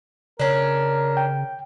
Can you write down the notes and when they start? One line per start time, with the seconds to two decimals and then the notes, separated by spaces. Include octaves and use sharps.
0.40 C#3 C#4 D4 A#4
1.17 G5